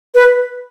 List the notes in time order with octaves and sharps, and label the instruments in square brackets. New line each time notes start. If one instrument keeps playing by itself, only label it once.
[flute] B4